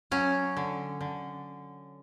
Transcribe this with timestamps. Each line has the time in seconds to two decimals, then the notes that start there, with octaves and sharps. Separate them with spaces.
0.11 F#3 C#4
0.57 D3
1.01 D3